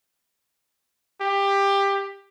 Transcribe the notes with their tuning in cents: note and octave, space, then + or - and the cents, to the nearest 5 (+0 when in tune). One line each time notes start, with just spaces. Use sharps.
G4 +15